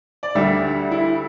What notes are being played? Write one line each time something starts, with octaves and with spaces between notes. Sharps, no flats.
D5
D2 D3 G3 E5
E4